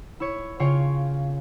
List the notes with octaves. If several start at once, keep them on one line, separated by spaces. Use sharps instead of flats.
E4 C#5
C#3 F4 C#5 G5